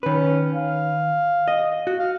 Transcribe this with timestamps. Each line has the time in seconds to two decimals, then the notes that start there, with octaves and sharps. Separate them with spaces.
0.03 D#3 C#4 B4
0.54 F5
1.48 D#5
1.87 F#4
1.99 F5